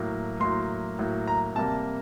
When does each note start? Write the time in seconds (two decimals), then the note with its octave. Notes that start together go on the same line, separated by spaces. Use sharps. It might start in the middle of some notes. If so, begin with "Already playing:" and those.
Already playing: A2 F#3 A#3
0.40 A2 F#3 A#3 C6
0.99 A2 F#3 A#3
1.27 A#5
1.56 C3 G3 A#3 A5